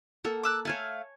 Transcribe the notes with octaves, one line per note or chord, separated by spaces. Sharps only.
A#3 A4 F#5
D6 E6 F#6
A3 C#5 F5 G#5 A5